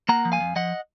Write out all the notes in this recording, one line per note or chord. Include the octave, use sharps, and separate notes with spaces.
A#3 F#5 A#5
F3
F5 G#5
F2
F3 D#5 F#5